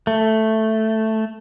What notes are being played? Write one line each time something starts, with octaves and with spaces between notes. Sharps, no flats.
A3